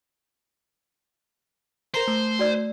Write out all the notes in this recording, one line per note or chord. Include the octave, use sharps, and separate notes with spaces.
A#4 C5 A#5 C6
A3
F#4 D5 E6